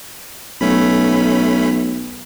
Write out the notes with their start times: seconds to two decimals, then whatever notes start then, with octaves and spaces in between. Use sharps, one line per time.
0.61 B1 A3 C#4 B5